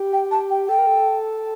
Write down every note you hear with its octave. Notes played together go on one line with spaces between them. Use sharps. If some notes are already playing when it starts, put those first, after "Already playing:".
Already playing: G4
G5
A5
G5
A4 G5
A#4
A4